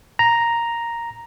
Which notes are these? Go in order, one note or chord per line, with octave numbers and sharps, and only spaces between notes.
A#5